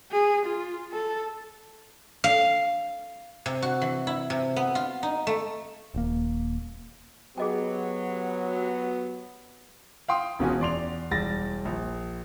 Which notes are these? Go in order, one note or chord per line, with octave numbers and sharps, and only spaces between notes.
G#4
F4
A4
F5
C3
F#4
E3
E4
C3
B3
F4
D#4
A3
D#1 A#3
F#3 B3 G4 G#4 D#5 G5
F5 G5 C6 D#6
E1 B3 C#4 F4 F#4 G#5
E2 D5 C6 F7
E1 G3 A6 A#6
A#1